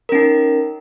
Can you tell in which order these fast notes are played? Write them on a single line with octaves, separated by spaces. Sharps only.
A#4 C#4 D#4